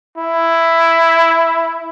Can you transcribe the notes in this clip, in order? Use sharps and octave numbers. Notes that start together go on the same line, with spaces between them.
E4